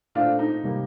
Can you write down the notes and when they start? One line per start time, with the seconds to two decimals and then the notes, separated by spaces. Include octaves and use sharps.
0.15 A#2 A3 C4 D4 F4
0.39 D#4
0.63 C3 G3 A#3